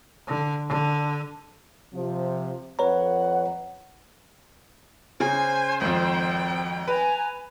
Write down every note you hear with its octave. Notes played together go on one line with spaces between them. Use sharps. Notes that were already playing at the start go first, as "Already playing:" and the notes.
D3
D3
C3 F3
F2 B4 C#5 F#5 A#5
C#3 C5 G#5
G#1 F2 G5
B4 G#5 A#5